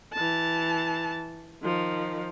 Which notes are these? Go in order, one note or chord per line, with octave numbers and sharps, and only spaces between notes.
E3 A5
D#3 F3